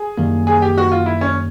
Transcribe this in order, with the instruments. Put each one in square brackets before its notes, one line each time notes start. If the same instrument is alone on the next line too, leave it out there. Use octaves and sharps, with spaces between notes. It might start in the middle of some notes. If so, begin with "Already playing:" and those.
Already playing: [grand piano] G#4
[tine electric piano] F#2 D#3 G3 A#3
[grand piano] G#4
G4
F#4
F4
E4
C#4